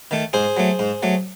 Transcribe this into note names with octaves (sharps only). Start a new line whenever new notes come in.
D#3 A3
G#2 G#4 C5
F#3 A3
G#2
F#3 A3